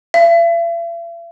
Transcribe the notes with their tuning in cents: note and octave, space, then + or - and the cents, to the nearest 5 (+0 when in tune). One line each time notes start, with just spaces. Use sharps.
E5 +45